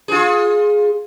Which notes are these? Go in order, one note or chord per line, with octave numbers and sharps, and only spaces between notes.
F4 G#4